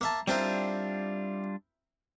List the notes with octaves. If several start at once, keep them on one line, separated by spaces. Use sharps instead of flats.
A#3 E5 A5
G3 C4 D4 E4 F4 A#4